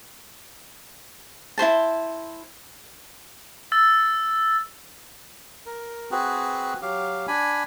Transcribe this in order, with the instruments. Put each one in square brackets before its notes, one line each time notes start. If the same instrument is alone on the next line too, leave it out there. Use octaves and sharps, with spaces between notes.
[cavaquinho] E4 G#4 C5 A5
[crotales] E6 A6
[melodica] A#4
C4 F#4 G#4 B4
F#3 G4 F5
D4 G#5 B5